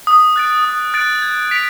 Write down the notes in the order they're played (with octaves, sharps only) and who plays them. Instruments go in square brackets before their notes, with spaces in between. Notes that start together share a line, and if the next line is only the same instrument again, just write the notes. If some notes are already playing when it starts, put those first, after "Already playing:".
[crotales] D#6
F#6 A6 D7
D#6
F#6 A6 D7
G#6
B6 D7 F7